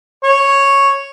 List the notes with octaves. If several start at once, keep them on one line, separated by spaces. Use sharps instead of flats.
C#5